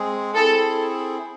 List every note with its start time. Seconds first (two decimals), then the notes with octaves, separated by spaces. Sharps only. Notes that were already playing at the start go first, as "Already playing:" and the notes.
Already playing: G#3 C4 G#4
0.35 C4 E4 G#4 A4